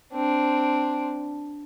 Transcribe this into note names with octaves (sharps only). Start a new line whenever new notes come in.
C4 D4